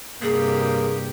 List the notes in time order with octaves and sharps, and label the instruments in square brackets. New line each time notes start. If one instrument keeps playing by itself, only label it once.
[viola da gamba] G2 C3 G4 [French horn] A#3 [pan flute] G#4